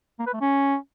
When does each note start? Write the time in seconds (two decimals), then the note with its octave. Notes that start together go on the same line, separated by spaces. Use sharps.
0.19 A#3
0.27 B4
0.34 A3
0.41 C#4